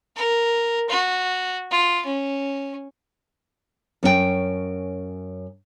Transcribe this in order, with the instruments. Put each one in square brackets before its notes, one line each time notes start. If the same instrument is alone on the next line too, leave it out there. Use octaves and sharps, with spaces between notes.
[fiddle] A#4
F#4
F4
C#4
[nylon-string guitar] F#2 C#4 G#4 G5